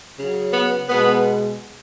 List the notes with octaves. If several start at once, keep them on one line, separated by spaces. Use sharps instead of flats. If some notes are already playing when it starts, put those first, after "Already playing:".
C#3 F#3
B3
B2 G#3 B3